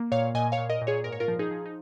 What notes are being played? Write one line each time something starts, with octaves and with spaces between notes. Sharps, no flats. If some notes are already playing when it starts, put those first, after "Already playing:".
Already playing: A#3
A#2 C#5 F5
A#2 D#5 G#5
C#5 F5
A#2
A#4 D#5
A#2
G#4 C#5
G#2 A#4
C#5
F4 A#4
F3
D#4 G#4
F3
D#4